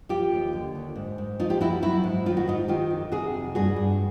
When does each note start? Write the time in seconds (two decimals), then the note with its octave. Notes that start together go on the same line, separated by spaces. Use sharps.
0.09 F3 F4 G4
0.32 D#2
0.53 D3
0.75 D#2
0.96 G#2
1.18 G#2
1.40 F3 D#4 F4
1.50 G4
1.60 F3 E4 F#4
1.82 F#3 E4 F#4
2.04 G#2
2.26 D#3 F4
2.37 F#4
2.48 G#2 D#4 F4
2.68 D#3 F4 G4
2.91 F2
3.12 C3 F#4 G#4
3.34 F2
3.55 G2 F#4 G#4
3.76 G2